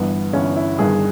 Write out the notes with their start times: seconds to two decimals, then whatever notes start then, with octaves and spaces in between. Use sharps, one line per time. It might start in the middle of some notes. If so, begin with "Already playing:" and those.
Already playing: G1 G2 E3 B3
0.33 G1 G2 E3 C#4
0.56 E4
0.79 G1 G2 D#3 G#4